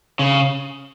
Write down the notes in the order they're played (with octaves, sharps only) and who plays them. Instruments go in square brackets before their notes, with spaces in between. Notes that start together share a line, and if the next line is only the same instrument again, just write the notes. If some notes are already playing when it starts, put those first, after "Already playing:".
[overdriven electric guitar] C#3